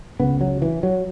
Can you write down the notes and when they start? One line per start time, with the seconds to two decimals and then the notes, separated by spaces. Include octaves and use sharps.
0.20 C#2 C#3 B3
0.41 F#3
0.62 E3
0.83 F#3